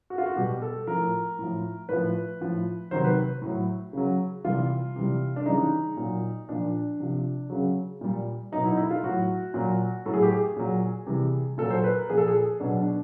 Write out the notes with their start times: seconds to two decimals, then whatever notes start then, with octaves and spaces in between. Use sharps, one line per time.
0.10 F#4
0.18 F4
0.26 F#4
0.36 B2 G3 G4
0.62 A4
0.87 A2 F3 A#4
1.39 A2 F3
1.89 A2 F3 B4
2.41 A2 F3
2.91 C3 D#3 F#3 C5
3.04 B4
3.42 A2 F#3
3.93 C#3 F#3
4.44 C3 E3 G3 F4
4.96 C3 E3 G3
5.36 D4
5.46 C#3 E3 G3 D#4
5.97 A#2 F#3
6.49 A#2 F3 D4
7.00 C3 F3
7.50 C#3 F#3
8.01 A#2 G3
8.52 B2 F#3 D#4
8.65 E4
8.74 D#4
8.77 E4
8.91 F4
9.03 A2 F#3 F#4
9.54 A#2 F#3
10.05 A2 F#3 A4
10.14 G#4
10.23 G4
10.32 G#4
10.56 A#2 F#3
11.07 C3 E3 G3
11.58 A#2 F#3 A4
11.70 C5
11.84 B4
11.96 A#4
12.10 A#2 F3 G#4
12.18 A4
12.27 G#4
12.60 B2 F#3 D4
12.77 D4